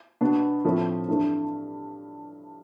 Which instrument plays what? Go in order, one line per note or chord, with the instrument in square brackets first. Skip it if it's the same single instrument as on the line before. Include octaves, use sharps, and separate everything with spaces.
[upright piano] B2 B3 D4
A2 F3 A3 C4 E4
G2 E3 A3 D4